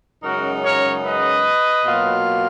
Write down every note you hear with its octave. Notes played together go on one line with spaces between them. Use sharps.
F#2 C#3 G#3 D#4 F#4 A#4
A#4 C#5
B4 D#5
B2 F#3 A#3 F4